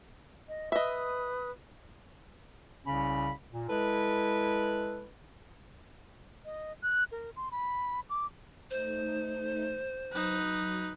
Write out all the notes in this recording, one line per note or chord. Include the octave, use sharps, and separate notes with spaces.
D#5
B4 D#5 E5 D#6
C2 C#3 C#4 B5
A#2
G#3 E4 A4 B4
D#5
F#6
A#4
C6
B5
D6
A3 D#4 C5
F#3 D#4 B4